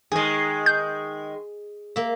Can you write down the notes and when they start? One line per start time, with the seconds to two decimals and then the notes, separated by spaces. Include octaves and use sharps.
0.12 D#3 G#3 G#4 D#5
0.66 G6
1.96 A#3 E5